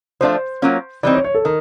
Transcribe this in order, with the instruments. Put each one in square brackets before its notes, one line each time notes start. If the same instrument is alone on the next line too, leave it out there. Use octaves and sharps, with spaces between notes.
[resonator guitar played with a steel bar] F3 A3 D4 F4 [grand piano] C5
[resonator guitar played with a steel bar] F#3 A#3 C#4 F4
[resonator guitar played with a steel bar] E3 G3 C4 D#4 [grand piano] D5
[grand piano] C#5
C#5
A4
[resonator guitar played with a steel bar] D#3 [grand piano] A#4